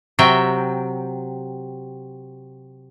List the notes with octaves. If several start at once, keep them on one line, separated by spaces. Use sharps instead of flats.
C3 F#3 E5 G5